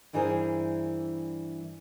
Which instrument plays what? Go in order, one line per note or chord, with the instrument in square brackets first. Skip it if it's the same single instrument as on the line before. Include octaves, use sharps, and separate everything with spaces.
[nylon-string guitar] G2 E3 E4 G#4 A#4 C5